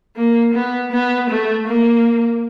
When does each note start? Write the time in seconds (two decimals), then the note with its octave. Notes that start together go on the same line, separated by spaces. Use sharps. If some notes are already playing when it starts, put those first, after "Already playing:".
0.16 A#3
0.54 B3
0.92 B3
1.30 A3
1.67 A#3